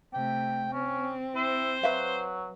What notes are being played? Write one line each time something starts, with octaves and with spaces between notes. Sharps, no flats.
C3 A3 G5
C4 C#4
E4 C5
F#3 B4 E5 F5